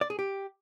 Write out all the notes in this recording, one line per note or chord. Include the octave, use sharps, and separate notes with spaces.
D5
G#4
G4